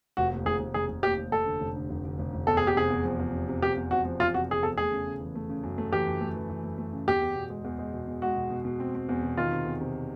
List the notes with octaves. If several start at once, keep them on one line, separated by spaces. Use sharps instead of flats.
F1 F#4
D#2
F1 G#4
F1
F1 G#4
F1
D#2 G4
F1
F1 A4
D3
F1
D3
F1
D3
F1
F1
E2 A4
E2 G#4
G4
C3 G#4
E2
F3
E2
C3
C3
E2 G4
E2
C3 F#4
F3
E2 F4
C3 F#4
C3 G#4
E2 A4
A3 G#4
C#3
C#3
E3
A3
C#3
F#2
A3
E3 G4
F#2
A3
E3
E3
A3
A3
C#3
E2 G4
E2
B2
G#3
E2
G#3
B2
B2
G#3 F#4
B2
B2
B2
C4
C4
E2
B2
D#3 F4
C3
E2
C3